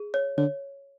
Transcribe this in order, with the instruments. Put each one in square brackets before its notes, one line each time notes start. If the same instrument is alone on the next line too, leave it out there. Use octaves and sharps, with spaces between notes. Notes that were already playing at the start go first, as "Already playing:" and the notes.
Already playing: [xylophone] G#4
C#5
[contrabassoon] D3 [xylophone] C#5